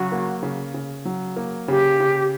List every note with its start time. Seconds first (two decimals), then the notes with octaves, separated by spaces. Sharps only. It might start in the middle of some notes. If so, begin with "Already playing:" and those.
Already playing: C#3 F#3 F#4
0.12 A#3
0.43 C#3
0.74 C#3
1.05 F#3
1.36 A#3
1.68 C#3 G4
2.00 C#3